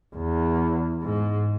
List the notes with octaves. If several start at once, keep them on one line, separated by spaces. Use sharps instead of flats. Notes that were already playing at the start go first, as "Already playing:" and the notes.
E2
G#2